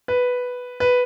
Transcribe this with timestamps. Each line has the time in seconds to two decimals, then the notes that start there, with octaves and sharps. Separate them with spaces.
0.08 B4
0.80 B4